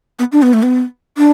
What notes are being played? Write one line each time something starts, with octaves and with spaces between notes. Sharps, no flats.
B3
D4
B3
A3
B3
D4